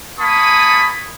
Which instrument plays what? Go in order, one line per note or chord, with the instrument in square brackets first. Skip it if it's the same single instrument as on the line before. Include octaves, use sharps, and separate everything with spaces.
[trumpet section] A#3 G#5 A5 B5 C#6 D#6